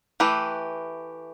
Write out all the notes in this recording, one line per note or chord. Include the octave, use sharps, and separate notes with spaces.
E3 A3 G4 B4